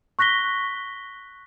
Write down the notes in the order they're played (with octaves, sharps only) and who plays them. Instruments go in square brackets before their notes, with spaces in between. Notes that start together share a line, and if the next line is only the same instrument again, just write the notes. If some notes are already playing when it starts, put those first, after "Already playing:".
[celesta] C#6 F#6 A#6 B6 G7